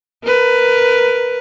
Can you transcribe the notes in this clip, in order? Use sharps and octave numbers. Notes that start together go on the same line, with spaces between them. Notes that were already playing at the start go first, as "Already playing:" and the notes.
A#4 B4